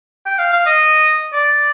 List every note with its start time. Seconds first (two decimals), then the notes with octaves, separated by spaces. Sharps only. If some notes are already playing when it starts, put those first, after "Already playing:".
0.26 G5
0.39 F5
0.53 F5
0.66 D#5
1.33 D5